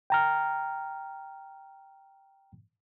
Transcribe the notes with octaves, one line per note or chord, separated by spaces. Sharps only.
G5 A#5 F6